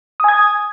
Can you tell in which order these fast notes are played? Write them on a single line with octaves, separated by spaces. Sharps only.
D#6 G#5 G#6